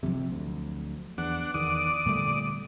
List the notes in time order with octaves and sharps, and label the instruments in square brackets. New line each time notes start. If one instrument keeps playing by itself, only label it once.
[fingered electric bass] F1 F2 C3 [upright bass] F3 F#3
[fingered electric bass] D2
[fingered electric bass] E2 [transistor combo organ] D4 F#5
[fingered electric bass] E2 D#3 [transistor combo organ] D5 D6 D#6
[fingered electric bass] A#2 G3 A3 [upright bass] D3 B3